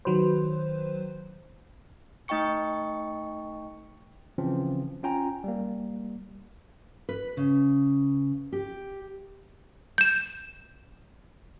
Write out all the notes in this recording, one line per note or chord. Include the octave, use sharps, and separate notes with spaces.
D#3 F#3 B4 C5
A3 D#4 D#5 G5 C#6 C#7
C#3 E3 F3 C4 C#4
C#4 F4 G5 G#5 A#5
G3 A#3
B4
C#3
G4
G6 E7